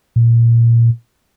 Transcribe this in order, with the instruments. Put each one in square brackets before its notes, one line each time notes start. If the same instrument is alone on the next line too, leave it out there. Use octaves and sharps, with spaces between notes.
[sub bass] A#2